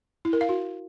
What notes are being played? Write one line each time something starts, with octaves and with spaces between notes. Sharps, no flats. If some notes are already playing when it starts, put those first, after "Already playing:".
E4
A#4
F5
F#4